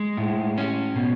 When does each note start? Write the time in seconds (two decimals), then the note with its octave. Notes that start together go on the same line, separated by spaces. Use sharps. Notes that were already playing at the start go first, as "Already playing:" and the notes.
Already playing: G#3
0.17 A2
0.58 C#4
0.96 B2